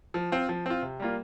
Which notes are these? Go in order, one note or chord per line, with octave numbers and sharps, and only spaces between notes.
F3
C4 F4
F3
C4 F4
C3
G3 A#3 F4